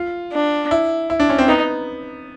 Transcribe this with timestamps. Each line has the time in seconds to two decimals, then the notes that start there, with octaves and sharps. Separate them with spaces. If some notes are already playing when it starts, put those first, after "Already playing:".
Already playing: F4
0.32 D4
0.71 E4
1.10 E4
1.20 D4
1.30 C#4
1.38 C4
1.48 B3 D#4